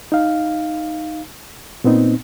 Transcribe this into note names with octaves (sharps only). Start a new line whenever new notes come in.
D#4 F5
A#2 B3 C4 D#4